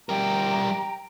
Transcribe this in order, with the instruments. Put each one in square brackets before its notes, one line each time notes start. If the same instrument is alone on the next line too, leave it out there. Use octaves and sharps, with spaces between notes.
[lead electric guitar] G3 A#4 [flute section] G5 A#5